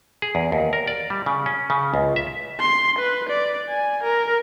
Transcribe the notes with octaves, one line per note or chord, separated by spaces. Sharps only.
G#4
E2
D#2
A#4
D5
G3
C#3
C#4
C#3
C#2
E5
C6
B4
D5
G#5
A#4